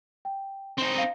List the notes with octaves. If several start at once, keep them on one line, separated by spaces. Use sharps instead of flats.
G5
C4 D#4 C6
F5 A#6